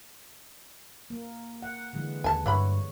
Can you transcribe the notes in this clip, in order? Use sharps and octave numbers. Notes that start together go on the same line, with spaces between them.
A#3
F#5
D3 E3 G#3
D#2 G#5 A5
G2 E3 C#5 F#5 B5